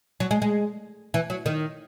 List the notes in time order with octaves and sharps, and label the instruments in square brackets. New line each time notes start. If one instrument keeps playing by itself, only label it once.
[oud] F#3
G#3
G#3
E3
F#3
D#3